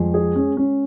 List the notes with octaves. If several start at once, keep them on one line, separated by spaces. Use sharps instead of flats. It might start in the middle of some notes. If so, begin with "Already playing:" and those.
Already playing: F2 G#3
G#4
C#4
C#4